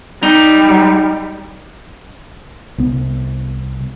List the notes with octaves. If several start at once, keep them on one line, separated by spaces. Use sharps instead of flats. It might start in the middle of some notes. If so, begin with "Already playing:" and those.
G3 D#4
C2 B3